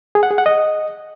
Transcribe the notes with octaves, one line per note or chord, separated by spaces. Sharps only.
G#4
F#5
G#4
F#5
D#5